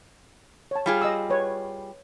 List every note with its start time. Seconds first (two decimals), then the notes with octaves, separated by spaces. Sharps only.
0.71 C#5 A5
0.86 G3 F4 G#4
1.02 D#5 E6
1.30 B4 C#5